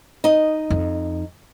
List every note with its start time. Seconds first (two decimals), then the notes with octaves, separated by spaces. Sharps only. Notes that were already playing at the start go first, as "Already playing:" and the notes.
0.24 D#4 D#5
0.70 F2